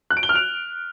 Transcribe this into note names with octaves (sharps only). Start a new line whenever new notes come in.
F#6
D7
G7
F6
F7